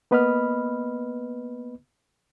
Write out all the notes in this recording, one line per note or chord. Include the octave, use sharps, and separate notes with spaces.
A#3 B3 B4 D#5 B5 F6